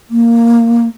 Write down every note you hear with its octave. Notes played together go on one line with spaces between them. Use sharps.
A#3